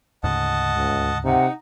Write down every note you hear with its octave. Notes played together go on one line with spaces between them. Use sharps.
D2 G#2 C#3 D#5 F#5 A5
C#2
C3 D#4 F#5